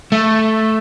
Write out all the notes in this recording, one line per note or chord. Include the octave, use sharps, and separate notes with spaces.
A3